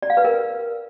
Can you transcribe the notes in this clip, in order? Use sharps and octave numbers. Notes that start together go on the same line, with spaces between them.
D5
F5
B4
A#4